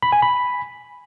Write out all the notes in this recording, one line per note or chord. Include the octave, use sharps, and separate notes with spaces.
B5
G#5
B5